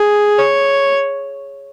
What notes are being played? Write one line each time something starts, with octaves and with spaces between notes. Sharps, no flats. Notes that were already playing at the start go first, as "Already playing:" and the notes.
Already playing: G#4
C#5